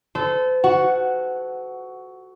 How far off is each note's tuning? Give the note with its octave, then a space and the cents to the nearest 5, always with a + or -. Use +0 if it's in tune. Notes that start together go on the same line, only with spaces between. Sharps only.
A4 -15 C5 -40
F#4 +10 F#5 +0